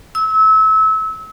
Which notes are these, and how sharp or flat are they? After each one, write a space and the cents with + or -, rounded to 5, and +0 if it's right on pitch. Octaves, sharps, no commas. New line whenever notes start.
E6 -30